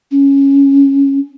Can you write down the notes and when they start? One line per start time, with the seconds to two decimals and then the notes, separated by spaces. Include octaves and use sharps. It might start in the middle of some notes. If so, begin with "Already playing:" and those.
0.11 C#4